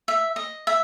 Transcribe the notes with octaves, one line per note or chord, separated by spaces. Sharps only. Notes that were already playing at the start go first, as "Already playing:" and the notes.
E5
D#5
E5